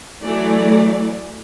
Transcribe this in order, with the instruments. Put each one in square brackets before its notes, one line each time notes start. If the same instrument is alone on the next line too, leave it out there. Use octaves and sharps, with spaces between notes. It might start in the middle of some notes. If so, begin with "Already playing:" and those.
[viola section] E3 F#3 A3 D5